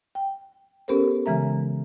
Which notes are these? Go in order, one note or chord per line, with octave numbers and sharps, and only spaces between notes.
G5
B3 C#4 G4 A4 A#4 C5
C#3 E3 G#3 E5 A#5